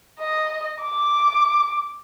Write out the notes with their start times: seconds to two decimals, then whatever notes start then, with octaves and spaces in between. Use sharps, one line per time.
0.20 D#5
0.82 D6